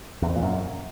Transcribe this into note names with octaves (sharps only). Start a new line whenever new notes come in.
E2
F2
A#2
F#2